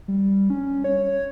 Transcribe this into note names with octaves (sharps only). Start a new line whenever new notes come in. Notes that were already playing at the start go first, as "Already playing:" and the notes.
G3
C#4
C#5